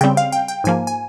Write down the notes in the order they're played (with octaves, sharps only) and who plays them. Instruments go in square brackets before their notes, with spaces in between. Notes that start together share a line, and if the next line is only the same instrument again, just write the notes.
[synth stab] C#3 G3 C4 G5
F5
G5
G5
G#2 F3 A#3 G#5
G#5